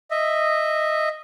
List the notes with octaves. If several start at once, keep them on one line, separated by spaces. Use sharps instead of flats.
D#5 E5